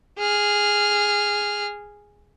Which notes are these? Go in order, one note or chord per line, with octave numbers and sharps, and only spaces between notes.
G#4 F6